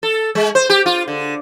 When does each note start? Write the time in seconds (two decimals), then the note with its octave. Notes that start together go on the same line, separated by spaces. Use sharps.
0.03 A4
0.35 G#3
0.55 C5
0.70 G4
0.86 F4
1.08 D3